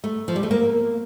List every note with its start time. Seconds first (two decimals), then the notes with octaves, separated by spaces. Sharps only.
0.04 A3
0.28 F3
0.36 G3
0.43 A3
0.51 A#3